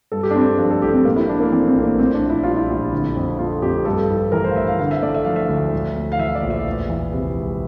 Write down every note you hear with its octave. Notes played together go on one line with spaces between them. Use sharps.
G2 A4
G4
D4
A3 C4
D4
F3 D4
A4
A1 G4
C4
A2 A#3
E4
A3 D4
A#3
E3 C4
C4
A#1
A#3
A2 C4
D4
A#1
E4
G3 F4
E4
A#1
D3
F2
A3 F4
F2 G4
G2 A4
A1
E3 A#4
C5
F5
A1 E5
F5
D3 F5
E5
A3 D5
E5
F3 F5
E5
D2
A2
A3
F5
E3 E5
D5
A#1
E5
E2
E3
C3
E1